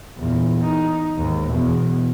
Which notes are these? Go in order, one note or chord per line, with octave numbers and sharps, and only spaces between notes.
E2 A#2
D#4
D#2 G#2
E2 B2